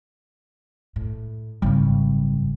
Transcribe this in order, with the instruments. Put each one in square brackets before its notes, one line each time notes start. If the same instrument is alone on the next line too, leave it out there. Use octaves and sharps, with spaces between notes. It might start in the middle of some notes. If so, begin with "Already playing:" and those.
[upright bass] A2
[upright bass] G#1 F#2 [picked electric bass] C#3 G3